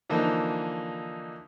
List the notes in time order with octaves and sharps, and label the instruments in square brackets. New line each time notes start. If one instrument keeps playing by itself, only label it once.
[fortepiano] D3 E3 F3 A#3 D#4